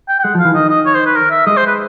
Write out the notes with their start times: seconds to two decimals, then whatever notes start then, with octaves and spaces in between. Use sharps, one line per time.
0.08 G5
0.19 G5
0.23 G#3 F#5
0.35 F3
0.39 F5
0.45 E3
0.55 D#3 D#5
0.69 D#5
0.86 C#5
0.95 C5
1.06 B4
1.16 A#4
1.31 E5
1.47 G#3 D#5
1.57 C5
1.67 B4